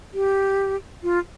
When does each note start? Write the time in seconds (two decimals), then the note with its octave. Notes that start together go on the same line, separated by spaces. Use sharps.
0.14 G4
1.03 F4